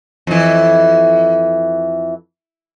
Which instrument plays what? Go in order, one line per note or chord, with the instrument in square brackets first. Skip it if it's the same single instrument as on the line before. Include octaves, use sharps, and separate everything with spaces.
[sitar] F2 E3